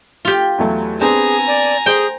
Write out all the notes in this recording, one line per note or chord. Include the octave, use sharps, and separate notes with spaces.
F4 G4
E2 F#3 A3
B3 C4 D4 G#4 G#5 A#5
D5
G#4 C5 G5